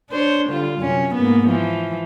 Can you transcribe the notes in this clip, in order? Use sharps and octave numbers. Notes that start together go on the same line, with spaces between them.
D4 C5 C#5
D3 G3 F4
F#2 C3 C#4
G#2 A#3 B3
E3 F3